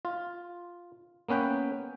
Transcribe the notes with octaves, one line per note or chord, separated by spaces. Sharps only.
F4
A#3 B3 C#4 B4 G5